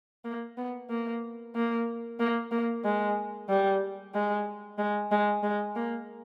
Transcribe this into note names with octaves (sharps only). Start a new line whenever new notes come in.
A#3
B3
A#3
A#3
A#3
A#3
G#3
G3
G#3
G#3
G#3
G#3
A#3